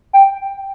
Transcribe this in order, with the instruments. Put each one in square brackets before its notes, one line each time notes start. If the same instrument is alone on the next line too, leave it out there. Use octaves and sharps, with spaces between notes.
[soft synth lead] G5